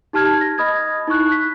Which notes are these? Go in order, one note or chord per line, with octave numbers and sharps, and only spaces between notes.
D#4 G4 A5 F6 G#6
A#6
D#5 B5 D#6 F6 G#6
D#4 E4 C#6 F#6
B6